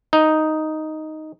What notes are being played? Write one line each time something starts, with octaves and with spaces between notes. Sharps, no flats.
D#4